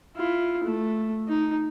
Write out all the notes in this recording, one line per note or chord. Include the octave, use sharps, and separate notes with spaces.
E4 F4
A3
D#4